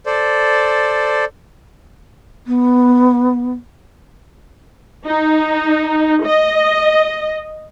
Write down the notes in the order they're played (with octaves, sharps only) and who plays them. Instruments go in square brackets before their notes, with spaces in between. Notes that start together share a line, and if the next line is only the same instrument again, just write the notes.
[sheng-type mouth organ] A4 C5 D5
[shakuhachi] B3
[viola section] D#4
D#5